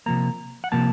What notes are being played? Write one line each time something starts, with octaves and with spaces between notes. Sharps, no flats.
C3 F3 A#3 A#5
F#5
C3 F3 A#3 A5